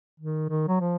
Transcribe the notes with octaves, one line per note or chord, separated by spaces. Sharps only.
D#3
D#3
F#3
F3